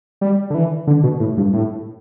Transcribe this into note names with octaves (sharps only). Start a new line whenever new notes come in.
G3
D3
E3
D3
B2
A2
G2
A2